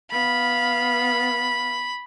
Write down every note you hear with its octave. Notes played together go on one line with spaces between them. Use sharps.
B3 F5 B5